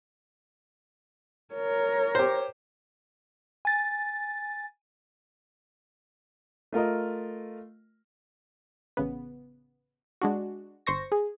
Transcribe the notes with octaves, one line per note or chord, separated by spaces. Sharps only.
A#4 C#5
G4 C5
G#5 A6
A3 F4 A#4 D#5
A1 C#3 B3
G#3 D4 F#4
G1 C5 C#6 A#6
G#4